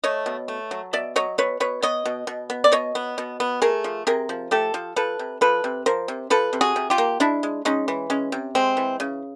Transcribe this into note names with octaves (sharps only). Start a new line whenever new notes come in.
A3 C#5 D#5
B2
A3
F#3
B2 D5 E5
F#3 C#5 D#5
B2 B4 C#5
B2 B4 C#5
B3 C#5 D#5
B2
B2
B3
D5
B2 C#5 D#5
B3
B2
B3
A3 G#4 A#4
F3
C3 G#4 A#4
F3
A3 G4 A4
F3
F3 A4 B4
C3
F3 A4 B4
C3
F3 A#4 C5
C3
F3 A4 B4
C3
F#4 G#4
C3
F4 G4
A#3
G#3 D4 E4
G#3
G#3 C#4 D#4
E3
G#3 C#4
C3
G#3 C4
E3
C#3